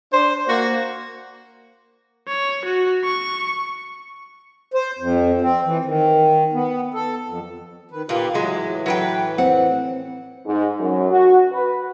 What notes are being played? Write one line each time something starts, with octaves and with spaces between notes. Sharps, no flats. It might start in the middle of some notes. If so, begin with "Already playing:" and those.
D4 C5
A#3 F#4
C#5
F#4
C#6
C5
F2
C4
E3
D#3
B3
A4
F2
D#3 B4
A#2 A#3 F4 G4 B4
A2 E3 F#3 G#3
F#3 B4 G5
C4 F#5
G#2
F#2
F#4
B4